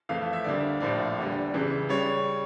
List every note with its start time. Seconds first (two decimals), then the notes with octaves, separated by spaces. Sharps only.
0.09 F2 E3 A3 F5
0.33 E5
0.44 D2 D3 G3 A#3 D5
0.81 A#1 A2 F3 A#3 D5
1.18 E2 D3 G3
1.53 C#2 C#3 E3
1.89 C#3 G3 C#5